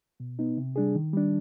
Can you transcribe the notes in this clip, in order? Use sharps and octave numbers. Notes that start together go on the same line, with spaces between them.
B2
B3 D#4
C3
G3 D4 G#4
D#3
G3 D4